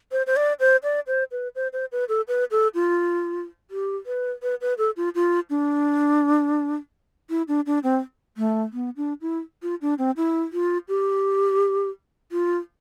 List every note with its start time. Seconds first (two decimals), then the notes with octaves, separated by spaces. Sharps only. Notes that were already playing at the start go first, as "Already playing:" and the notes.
0.12 C5
0.27 C5
0.36 D5
0.60 C5
0.83 D5
1.07 C5
1.32 B4
1.55 C5
1.73 C5
1.92 B4
2.09 A4
2.28 B4
2.51 A4
2.75 F4
3.71 G4
4.06 B4
4.42 B4
4.61 B4
4.78 A4
4.97 F4
5.15 F4
5.50 D4
7.30 E4
7.48 D4
7.66 D4
7.83 C4
8.37 A3
8.73 B3
8.97 D4
9.21 E4
9.63 F4
9.82 D4
9.98 C4
10.17 E4
10.53 F4
10.88 G4
12.32 F4